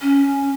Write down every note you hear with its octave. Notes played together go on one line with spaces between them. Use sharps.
C#4